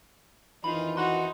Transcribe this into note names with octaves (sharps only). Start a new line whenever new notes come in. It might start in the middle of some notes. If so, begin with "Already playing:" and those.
F2 D#3 E3 D#4 F4 B5
D#4 F#4 C6